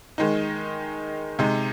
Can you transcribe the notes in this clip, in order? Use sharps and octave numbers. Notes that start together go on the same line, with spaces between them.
D#3 G#3 D#4
C3 G#3 D#4